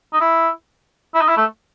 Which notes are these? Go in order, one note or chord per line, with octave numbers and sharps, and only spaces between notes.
D#4
E4
E4
D#4
E4
A3